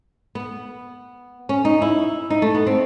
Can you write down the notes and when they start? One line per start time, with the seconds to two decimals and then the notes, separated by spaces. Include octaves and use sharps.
0.35 B3
1.49 C#4
1.65 D#4
1.82 E4
2.30 D#4
2.42 A3
2.54 B3
2.67 C4